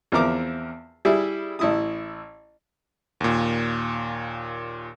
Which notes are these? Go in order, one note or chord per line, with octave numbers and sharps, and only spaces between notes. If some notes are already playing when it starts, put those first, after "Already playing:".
E2 F3 C4 A#4 E5 D6
G3 E4 G#4
A1 E4 D#6
D#2 A#2